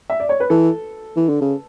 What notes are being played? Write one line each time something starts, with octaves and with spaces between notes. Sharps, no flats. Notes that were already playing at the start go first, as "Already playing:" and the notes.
E5
D5
C#5
B4
E3 A4
E3
D3
C#3